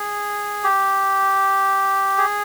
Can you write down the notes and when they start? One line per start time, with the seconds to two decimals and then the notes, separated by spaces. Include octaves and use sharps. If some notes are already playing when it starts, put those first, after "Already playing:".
Already playing: G#4
0.64 G4
2.18 G#4